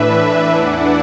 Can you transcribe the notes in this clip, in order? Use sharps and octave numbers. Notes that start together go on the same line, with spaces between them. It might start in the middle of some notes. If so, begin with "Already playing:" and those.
Already playing: A2 E3 D4 B4 E5
E2 E3 D4 D5 F#5